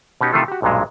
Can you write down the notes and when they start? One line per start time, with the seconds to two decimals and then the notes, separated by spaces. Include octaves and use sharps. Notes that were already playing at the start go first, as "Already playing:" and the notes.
0.21 B2 B3 C#4 D#4 G4
0.32 C3 D#3 E3 A3 F4 A4
0.48 F#4 G4
0.62 B1 G2 A#2 F#3 G#3